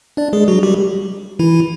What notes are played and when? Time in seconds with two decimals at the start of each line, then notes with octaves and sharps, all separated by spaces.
0.17 D4 D5
0.33 G#3 G#4
0.48 F#3 F#4
0.63 G3 G4
1.39 E3 E4